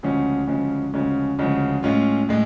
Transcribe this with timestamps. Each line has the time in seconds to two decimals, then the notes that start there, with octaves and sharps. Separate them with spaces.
0.03 D2 C#3 F3 G#3 C#4
0.48 D2 C#3 F3 G#3 C#4
0.94 D2 C#3 F3 G#3 C#4
1.39 D2 C#3 F3 G#3 C#4
1.83 A2 G#3 C#4 F4
2.29 A2 G#3